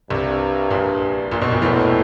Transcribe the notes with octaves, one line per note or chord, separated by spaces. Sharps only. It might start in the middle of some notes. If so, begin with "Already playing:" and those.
C2 G2 C3
A#1 A#2
A#1 A#2
B1 B2
A#1 A#2
E2 A2 E3